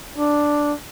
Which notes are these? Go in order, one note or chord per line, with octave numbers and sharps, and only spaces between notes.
D4